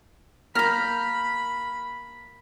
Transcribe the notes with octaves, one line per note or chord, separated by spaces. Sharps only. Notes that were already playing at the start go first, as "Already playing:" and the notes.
A#3 A#5 B5 F6 G6 A#6